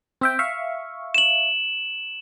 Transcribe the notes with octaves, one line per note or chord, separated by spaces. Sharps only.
C4 E5 G5
E5 F5 C#6
E7 F#7